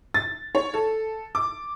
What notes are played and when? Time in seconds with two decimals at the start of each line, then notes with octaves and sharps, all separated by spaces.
0.14 A6
0.55 C#5
0.74 A4
1.35 D6